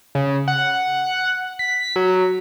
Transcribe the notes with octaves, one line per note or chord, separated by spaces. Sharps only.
C#3
F#5
B6
F#3